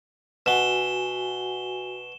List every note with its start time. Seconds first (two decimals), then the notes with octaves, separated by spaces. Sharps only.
0.46 B2 F#4 F#5 G#5 E7 G7